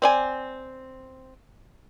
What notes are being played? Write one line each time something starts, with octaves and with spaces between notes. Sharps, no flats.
C4 D5 G#5